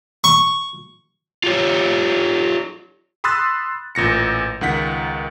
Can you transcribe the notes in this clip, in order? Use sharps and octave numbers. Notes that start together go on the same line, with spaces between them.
C#6
F4 G4 C#5
B5 C6 D#6 E6 F#6 A6
A1 A#2 A#6 C#7
C#2 D#3 F#5 B6